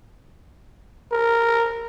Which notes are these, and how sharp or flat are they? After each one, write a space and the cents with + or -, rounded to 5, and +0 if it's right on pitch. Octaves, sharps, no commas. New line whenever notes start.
A#4 -5